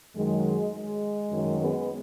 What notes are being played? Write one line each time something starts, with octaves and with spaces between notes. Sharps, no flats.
F#2 D#3 F#3 G#3
G#3
F#2 D#3 F#3
G#3 B3